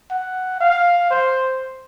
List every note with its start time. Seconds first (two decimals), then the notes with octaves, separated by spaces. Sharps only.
0.11 F#5
0.60 F5
1.10 C5